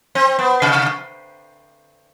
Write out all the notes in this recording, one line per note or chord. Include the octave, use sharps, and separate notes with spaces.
C4
B3
C3